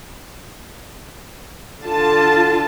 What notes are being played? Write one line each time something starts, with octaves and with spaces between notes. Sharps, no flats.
D3 F4 A5